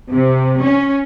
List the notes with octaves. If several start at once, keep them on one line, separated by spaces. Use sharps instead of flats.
C3
C#4